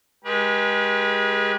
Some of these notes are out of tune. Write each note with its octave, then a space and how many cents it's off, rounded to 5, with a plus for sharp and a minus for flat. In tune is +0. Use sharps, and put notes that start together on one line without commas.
G#3 +0 G4 +0 B4 -40